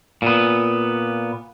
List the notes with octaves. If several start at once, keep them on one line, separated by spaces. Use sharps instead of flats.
A#2 B3